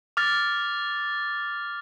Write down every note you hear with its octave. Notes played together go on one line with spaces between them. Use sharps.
D6 F6 A6